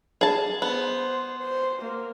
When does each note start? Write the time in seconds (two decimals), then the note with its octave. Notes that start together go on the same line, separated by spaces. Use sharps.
0.21 G#4 A5
0.62 B3 C5
1.42 C5
1.82 A#3